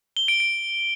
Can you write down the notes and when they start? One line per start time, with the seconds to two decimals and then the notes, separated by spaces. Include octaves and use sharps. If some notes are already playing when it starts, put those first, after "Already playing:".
0.17 G7
0.28 D7
0.40 D7